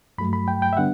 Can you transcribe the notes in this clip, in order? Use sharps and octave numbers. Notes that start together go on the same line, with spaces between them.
G2 F#3 A3 B5
B5
G5
G5
E5
D3 G3 B3 D4 F#5